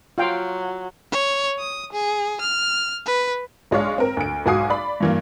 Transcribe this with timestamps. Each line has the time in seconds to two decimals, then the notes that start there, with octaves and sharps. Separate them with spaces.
0.18 F#3 F4 F5 G5
1.12 C#5
1.59 D#6
1.93 G#4
2.41 F6
3.06 B4
3.71 B1 G#3 D4 C#5 F5
3.98 C4 A#4
4.17 D2 D7
4.46 B1 G#2 F#4 G#5 D#6 C7
4.70 D5 B5
5.00 G2 E3 A#3